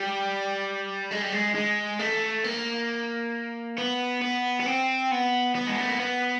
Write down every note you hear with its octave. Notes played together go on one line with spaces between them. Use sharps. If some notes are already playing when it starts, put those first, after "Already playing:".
Already playing: G3
G#3
G3
G#3
G#3
A3
A#3
B3
B3
B3
C4
B3
B3
G#3
A3
A#3
B3